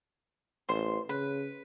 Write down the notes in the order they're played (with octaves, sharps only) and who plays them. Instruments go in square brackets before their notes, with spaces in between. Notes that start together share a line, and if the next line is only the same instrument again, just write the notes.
[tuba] A1 [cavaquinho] C5 C6
[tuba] C#3 [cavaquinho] B4